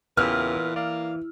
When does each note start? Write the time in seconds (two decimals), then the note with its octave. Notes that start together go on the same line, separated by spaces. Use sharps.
0.17 E2 A#2 C#3 E3 B3 G4 B4 F6
0.76 A#3 D5 F5